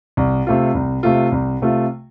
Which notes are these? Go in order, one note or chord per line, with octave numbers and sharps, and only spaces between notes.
C2
C3 A3 F4
C2
C3 A3 F4
C2
C3 A3 F4